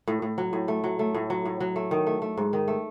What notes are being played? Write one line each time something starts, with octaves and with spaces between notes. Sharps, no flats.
A2
A2
F#3
A2
A3
F#3
A3
A2
F#3
A2
F#3
A3
D#3
A3
A3
G#2
D#3
A3